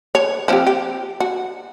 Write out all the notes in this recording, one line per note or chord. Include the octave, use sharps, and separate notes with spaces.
C#5
F3 C4 G4
G4
F#4